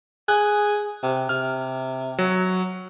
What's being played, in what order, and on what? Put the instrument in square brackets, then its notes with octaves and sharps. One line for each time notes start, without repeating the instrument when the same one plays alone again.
[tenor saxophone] G#4 [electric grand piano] F#6
[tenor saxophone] C3
[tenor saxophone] C3 [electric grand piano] F6
[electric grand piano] F#3